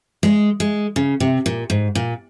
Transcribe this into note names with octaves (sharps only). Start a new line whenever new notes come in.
G#3
G#3
C#3
C3
A#2
G#2
A#2